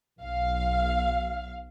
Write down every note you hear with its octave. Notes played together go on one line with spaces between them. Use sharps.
B1 F5